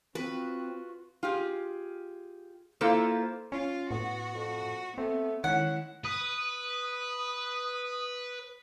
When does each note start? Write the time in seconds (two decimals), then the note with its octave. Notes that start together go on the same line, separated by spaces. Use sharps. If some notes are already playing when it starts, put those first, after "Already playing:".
0.15 C4 F4 F#4 B4
1.23 F4 G4 G#4
2.81 A#3 E4 F4 A4 C5
3.52 C#4 F4
3.91 A2 B3 F#4
4.34 F2
4.98 A3 B3 C4
5.44 D#3 G#3 C#4 E4 F#5
6.05 B4 D#6